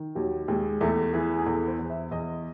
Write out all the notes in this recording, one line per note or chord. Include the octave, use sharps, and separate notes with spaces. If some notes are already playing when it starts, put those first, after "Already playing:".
Already playing: D#3
D#2 F#3
D#2 G#3
E2 A3
E3 G#4
G#4
E2 A4
C5
E2
E5
E2 D#5